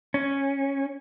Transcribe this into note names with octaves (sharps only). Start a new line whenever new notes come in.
C#4